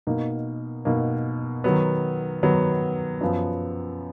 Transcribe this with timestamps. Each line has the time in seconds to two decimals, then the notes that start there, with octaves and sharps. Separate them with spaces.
0.07 B2 A#3 D#4
0.85 B2 A#3 D#4
1.64 D#3 F#3 B3
2.43 D#3 F#3 B3
3.21 F#2 F3 B3